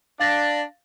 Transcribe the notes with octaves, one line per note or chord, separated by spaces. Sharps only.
D4 F5 A6 A#6